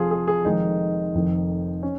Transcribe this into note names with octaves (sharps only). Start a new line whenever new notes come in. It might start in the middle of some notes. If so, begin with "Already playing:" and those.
Already playing: F1 F2 F3 F4 G#4
G#4
G#4
F1 F2 D#3 G#3 D#4
F1 F2 D#3
C#4